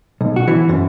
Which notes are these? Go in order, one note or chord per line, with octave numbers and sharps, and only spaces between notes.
B1
F#4
E3
F#2